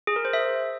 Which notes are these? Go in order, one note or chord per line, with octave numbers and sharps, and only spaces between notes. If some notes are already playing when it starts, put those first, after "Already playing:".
G#4
A#4
C5
E5